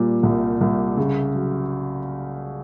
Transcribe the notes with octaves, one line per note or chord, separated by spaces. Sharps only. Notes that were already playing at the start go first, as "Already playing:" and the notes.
Already playing: A#2 G3
C2
C2
C#3
F#3